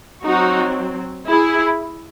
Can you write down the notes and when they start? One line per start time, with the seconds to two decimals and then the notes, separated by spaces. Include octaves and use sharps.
0.24 F#3 C4 D#4 F#4
1.28 E4 G#4